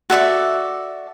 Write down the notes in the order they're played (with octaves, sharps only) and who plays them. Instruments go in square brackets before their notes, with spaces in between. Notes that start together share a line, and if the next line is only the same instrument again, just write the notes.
[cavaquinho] F#4 A4 D5 E5